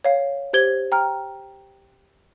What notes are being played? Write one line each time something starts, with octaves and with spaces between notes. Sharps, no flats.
C#5 F5
G4 C5 G#6 G7
G5 A#5 F6